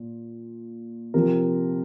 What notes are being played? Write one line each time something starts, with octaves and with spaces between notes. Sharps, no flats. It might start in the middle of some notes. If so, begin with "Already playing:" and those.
Already playing: A#2
C3 F3 A#4